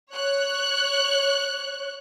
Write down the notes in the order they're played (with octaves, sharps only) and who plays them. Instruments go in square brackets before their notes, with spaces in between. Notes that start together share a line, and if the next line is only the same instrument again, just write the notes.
[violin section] C#5 F#6